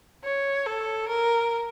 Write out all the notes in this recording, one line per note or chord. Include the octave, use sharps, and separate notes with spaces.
C#5
A4
A#4